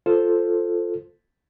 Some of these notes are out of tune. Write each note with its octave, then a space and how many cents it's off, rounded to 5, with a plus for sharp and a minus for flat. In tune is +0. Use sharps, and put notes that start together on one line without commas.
F4 +0 A4 +0 C5 +0